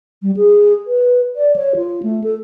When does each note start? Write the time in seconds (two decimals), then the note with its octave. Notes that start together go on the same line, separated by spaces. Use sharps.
0.22 G3
0.37 G#4
0.87 B4
1.36 D5
1.56 C#5
1.76 F4
2.03 A3
2.24 A4